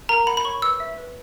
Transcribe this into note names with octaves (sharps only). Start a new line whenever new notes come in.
A#4 A#5
F#5 B5
B5
C#5 C#6
B4 E6
E5
B4